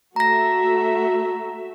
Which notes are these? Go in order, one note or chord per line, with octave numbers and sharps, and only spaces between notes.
A3 F#4 E5 A#5 A#6